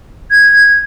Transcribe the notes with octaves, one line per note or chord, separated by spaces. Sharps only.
G#6